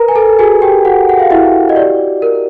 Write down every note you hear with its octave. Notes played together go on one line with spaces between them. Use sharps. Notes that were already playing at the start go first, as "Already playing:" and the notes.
Already playing: A#4 B4 A#5
G#5
A4 A5
F#4 G#4 G#5
G4 G5
F#4 F#5
F#5
F5
E4 F#4 E5
D#5
G4 D5
A#4